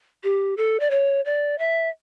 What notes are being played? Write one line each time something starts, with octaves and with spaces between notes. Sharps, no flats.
G4
A4
D5
C#5
D5
E5